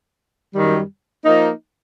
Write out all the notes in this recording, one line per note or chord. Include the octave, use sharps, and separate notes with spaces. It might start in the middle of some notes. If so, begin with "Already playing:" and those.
F#2 D#3 G3
F3 A#3 D#4